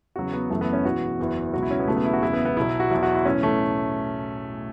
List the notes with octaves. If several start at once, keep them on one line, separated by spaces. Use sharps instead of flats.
E2 C#3 F#3 F#4
B3
F#1 F#2 E3 A3
B3
C#4
E1 E2 E3 F#4
F#1 E2 E3
C#2 B2 F#3 F#4
E4
C#4
B3
E1 E2 C#3 F#3 A3
B3
E4
F#4
F#1 E2 C#3 E3 E4
B3
B3
B1 B2 F#3 E4
F#4
E2 B2 F#3 E4
F#4
E4
B1 A2 E3 C#4
A3